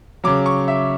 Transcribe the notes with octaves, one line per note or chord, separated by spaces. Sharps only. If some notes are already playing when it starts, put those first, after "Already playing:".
C#3 F#3 D6
C#6
E5